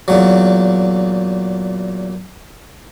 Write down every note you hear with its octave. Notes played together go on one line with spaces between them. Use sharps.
E2 A#2 F#3